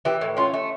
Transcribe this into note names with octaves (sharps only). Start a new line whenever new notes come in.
E3 G4
A2
C#4 F4
A3